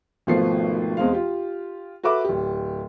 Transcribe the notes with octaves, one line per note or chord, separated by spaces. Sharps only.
G#1 B2 F3 A3 C7
E2 G#3 C4 F5
F4 G4
F#4 A4 B4 E5 D6
D1 G4